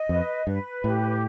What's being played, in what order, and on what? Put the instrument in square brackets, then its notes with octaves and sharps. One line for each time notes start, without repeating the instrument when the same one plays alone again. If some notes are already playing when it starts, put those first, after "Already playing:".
Already playing: [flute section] D#5
[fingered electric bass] F2 [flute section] B4
[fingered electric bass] G2 [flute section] B4
[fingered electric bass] A2 [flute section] G4